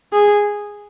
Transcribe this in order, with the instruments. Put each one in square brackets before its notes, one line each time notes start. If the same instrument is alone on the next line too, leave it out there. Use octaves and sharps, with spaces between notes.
[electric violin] G#4